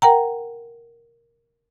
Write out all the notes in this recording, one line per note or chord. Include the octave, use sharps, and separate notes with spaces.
A#4 F#5 G5 A#5